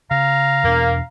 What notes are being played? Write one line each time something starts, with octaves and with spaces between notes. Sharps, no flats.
C#3 F5 A#5
E2 B2 A#3 D4